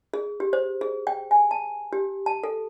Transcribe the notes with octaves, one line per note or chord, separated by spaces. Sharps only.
G#4
G4
C5
G#4
G5
G#5
A5
G4
A5
A4